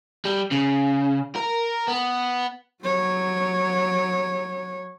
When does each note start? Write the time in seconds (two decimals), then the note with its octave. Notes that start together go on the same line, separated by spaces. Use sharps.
0.25 G3
0.51 C#3
1.35 A#4
1.88 B3
2.83 F#3 C#5